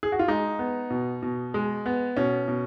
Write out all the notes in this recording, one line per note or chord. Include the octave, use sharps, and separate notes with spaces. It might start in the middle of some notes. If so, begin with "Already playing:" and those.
G#4
F#4
F4
G#3 D#4
B3
B2
B2
G#3
B3
B2 C#4
B2